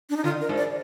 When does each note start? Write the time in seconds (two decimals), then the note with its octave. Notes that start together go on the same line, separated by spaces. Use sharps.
0.10 D4
0.17 D#4
0.24 D3 F4
0.41 A#4
0.49 G#2
0.57 D5